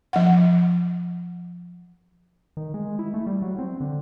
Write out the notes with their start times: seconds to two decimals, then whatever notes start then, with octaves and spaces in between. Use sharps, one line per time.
0.13 F3 F#5
2.57 D#3
2.74 G#3
2.99 E4
3.14 A3
3.27 G3
3.42 F#3
3.59 C4
3.80 D3